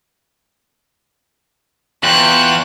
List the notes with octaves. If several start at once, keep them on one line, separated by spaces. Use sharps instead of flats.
E2 F4 G5 C#6 F#6